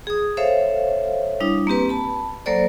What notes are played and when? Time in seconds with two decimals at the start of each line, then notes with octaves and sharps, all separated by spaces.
0.07 G#4 D#6
0.37 A4 C5 C#5 E5 F5
1.40 G3 D4 E4 D#6
1.67 A#3 C4 G4 B4
1.89 A5 B5
2.46 F#3 A#3 A4 C5 D5